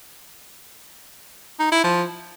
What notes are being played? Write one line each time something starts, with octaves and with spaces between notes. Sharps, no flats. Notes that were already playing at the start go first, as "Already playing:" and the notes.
D#4
E4
F3